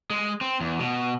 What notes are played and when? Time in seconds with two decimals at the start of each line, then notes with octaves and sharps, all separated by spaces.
0.10 G#3
0.41 C4
0.61 E2
0.79 B2